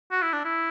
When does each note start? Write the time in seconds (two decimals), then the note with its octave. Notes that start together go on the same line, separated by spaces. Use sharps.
0.11 F#4
0.22 E4
0.33 D4
0.45 E4